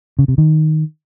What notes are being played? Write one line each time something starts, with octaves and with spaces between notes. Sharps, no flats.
C#3
C3
D#3